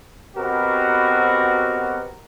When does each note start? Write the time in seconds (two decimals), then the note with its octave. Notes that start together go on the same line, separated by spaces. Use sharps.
0.36 B2 B3 C4 F#4 G4 A#4